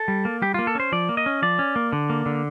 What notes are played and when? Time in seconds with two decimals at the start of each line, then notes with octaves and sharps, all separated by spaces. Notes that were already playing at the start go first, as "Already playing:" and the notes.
Already playing: A4
0.08 G3
0.25 A#3
0.42 G3 G4
0.54 A#3 F4
0.67 A4
0.75 C#4 C5
0.92 F3 D5
1.09 A#3
1.17 D#5
1.26 C#4
1.42 F3 D5
1.59 C#4
1.76 A#3
1.93 D3
2.10 A#3
2.26 D3